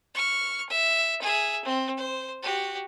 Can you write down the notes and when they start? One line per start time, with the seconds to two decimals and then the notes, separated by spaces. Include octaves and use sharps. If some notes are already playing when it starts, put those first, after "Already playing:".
0.14 C#6 F6
0.69 E5
1.22 G#4 E5
1.64 C4
1.97 C5
2.42 F#4 G4